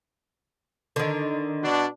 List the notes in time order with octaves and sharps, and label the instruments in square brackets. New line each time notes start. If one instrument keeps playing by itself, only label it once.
[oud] D3 D#3
[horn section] B2 D4